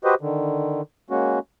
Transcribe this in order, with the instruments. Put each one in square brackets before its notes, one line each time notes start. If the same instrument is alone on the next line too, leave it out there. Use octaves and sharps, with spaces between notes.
[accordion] F#4 G4 B4 C5 D#5
D3 D#3
G#3 A#3 C#4 F#4